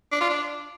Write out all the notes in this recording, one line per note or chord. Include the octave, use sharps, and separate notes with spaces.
D4
F4
D4